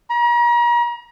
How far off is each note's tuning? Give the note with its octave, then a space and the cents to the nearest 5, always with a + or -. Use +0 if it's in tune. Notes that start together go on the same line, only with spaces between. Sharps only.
A#5 +40